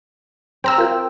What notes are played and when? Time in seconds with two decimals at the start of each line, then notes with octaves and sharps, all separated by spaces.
0.64 C4 G5 A#5 E6
0.78 F4 A#4 G5